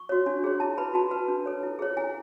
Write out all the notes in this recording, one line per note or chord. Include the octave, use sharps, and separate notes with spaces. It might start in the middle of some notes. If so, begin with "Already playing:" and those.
Already playing: C#6
F#4 C#5
D4
G#4 C#5
E4 A5
B4 B5
F#4 A5
B4
D4
A4 C#5
E4
G#4 C#5
E4 G#5